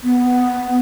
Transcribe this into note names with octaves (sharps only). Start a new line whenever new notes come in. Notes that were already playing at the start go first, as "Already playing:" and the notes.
B3